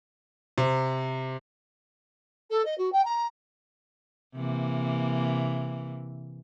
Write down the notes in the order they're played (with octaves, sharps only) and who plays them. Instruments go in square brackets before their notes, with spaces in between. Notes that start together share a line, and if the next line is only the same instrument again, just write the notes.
[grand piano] C3
[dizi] A4
D#5
F#4
G5
A#5
[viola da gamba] C3 E3 A#3